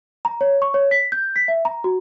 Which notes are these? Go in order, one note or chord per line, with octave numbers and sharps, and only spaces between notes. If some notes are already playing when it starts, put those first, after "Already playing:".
A#5
C#5
C#6
C#5
B6
G6
B6
E5
A#5
F#4